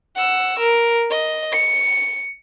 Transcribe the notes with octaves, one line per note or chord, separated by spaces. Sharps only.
F#5 E6
A#4
D#5
C#7